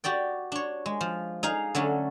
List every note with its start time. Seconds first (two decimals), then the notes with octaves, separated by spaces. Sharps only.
0.04 F#4 G4 D5 G5
0.52 D4 C#5
0.86 G#3
1.01 F3
1.43 D#4 G#4 F5
1.75 D3 F#3 A3 C#4